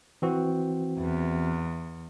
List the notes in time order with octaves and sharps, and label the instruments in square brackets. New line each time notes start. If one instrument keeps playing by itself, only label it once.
[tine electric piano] E3 C4 F#4
[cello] E2